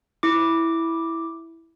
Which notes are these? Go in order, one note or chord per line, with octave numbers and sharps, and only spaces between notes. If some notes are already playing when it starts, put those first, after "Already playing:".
E4 D6